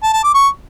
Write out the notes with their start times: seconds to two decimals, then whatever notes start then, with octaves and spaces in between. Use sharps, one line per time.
0.03 A5
0.13 A5
0.24 D6
0.34 C#6